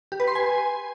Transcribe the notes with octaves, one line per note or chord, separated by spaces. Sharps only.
G4
B4
C6
G#5